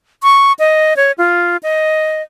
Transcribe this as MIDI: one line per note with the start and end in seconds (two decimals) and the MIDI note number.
0.23 0.52 85
0.59 0.96 75
0.96 1.12 73
1.18 1.57 65
1.63 2.22 75